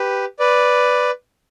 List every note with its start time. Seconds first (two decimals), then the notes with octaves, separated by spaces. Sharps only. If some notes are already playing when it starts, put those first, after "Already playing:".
Already playing: G4 B4
0.39 B4 D5